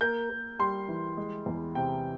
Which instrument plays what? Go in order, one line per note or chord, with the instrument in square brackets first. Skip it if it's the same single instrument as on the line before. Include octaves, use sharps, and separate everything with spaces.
[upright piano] A#3 G6
A#3
G3 C6
E3
G#3
E2
C3 G5